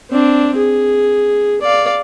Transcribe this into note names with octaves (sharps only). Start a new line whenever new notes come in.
C4 D4
G#4
D5 F5